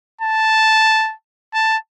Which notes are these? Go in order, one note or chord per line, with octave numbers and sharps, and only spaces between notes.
A5
A5